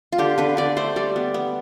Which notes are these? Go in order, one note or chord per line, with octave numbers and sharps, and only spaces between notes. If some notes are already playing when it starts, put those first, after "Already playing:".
F4
D3 G4
D3 B4
D3 D5
A3 C5
G3 D5
B3
B3